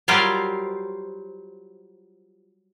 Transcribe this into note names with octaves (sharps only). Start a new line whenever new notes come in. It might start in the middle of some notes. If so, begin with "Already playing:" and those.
F#3 G3 F4 G4 A#4 C5